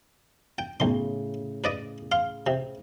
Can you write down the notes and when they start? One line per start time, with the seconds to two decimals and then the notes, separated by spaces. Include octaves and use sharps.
0.58 G5
0.80 B1 A2 C#3 C6
1.64 B4 D5 D#5
2.12 F5 C6
2.47 C3